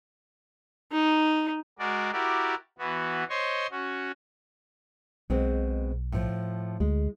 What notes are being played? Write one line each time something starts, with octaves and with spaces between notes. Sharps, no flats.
D#4
G#3 F#4 A#4 D5
E4 F#4 G4 A#4 D5
E3 B3 F#4
C5 C#5 D#5 C6 C#6
C#4 F#4
B1 B2 G#3 C4
A2 F3
D2 G#3